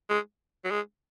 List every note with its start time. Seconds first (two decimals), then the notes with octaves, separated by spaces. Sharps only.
0.10 G#3
0.64 F#3
0.71 G#3